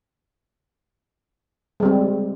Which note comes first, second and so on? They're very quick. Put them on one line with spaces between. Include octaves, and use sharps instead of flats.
G#3 G3 C4